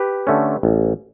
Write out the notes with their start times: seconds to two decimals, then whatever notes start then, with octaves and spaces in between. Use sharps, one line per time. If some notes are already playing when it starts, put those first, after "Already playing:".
Already playing: G4 B4
0.27 D3 A3 C#4
0.63 A1